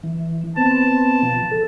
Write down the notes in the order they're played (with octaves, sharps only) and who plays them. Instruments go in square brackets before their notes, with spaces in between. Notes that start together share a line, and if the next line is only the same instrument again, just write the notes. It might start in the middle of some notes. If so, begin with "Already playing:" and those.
[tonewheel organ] E3
[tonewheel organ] B3 C4 [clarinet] A5
[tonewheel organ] B2 F3
A4